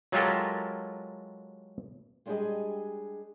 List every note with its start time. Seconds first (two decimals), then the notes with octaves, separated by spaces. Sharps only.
0.12 F#3 G#3 F4 G4 A4 A#4
2.26 G3 G#3 D4 G4 G#4 D#5